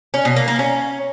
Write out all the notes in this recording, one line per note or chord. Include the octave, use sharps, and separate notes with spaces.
C#4
B2
A#3
A#3
C#4